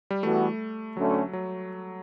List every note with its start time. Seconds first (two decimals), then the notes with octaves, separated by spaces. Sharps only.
0.11 G3
0.23 E3 G3 A3 B3 F#4 A4
0.96 D2 D3 F#3 A3 C#4
1.33 F#3